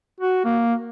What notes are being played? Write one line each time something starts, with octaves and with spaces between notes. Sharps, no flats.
F#4
A#3